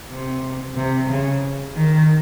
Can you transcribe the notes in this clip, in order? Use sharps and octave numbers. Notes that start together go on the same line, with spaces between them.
C3
C3
C#3
D#3